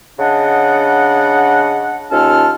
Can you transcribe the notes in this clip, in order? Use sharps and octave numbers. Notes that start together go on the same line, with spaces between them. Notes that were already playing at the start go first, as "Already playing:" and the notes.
C#3 D4 D#5 F#5
D#2 C#4 F4 A4 A5 F6